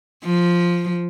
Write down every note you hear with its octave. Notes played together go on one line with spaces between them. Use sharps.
F3